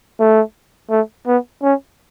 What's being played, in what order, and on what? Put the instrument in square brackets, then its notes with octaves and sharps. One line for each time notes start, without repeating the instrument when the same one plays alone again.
[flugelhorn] A3
A3
B3
C#4